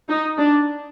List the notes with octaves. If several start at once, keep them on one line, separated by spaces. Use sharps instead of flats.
D#4
D4